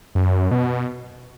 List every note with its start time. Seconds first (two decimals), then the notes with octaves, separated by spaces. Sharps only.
0.15 F#2
0.51 B2